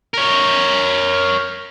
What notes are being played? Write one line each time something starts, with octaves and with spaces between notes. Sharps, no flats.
A#4 C#5